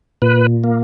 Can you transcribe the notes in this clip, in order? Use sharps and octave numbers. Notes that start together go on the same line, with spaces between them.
A#2 B4
A#3